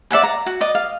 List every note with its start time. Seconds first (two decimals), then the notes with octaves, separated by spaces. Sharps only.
0.11 D5 E5 F#5 G#5
0.23 A#5
0.46 F#4
0.61 D5 D#5
0.75 F5